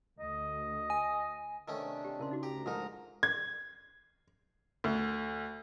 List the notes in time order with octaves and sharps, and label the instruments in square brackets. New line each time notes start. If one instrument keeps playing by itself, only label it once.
[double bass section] D2 [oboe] D#5
[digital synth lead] G#5
[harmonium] C3 D4 [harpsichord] D#3 A3 C#4
[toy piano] G4
[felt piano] C#3 [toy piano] E4 A#4 C6
[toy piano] D#4 F#4
[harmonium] D2 A#5 [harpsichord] G4
[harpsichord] G#2 D#4 [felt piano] F3 G#3 A#4
[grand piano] G#6
D2